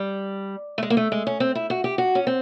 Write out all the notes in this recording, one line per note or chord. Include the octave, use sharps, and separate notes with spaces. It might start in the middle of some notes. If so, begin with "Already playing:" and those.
Already playing: G3
A3
G#3
A#3
A3
G#3
C#4
C4
E4
F#4
G4
F#4
C#4
C4